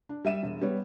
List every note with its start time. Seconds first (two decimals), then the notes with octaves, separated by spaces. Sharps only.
0.09 D4
0.25 G3 E5 D#7 E7
0.43 E1
0.61 G3 B3 C#5